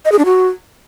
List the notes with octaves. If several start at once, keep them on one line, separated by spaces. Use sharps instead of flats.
D#5
G#4
D4
F#4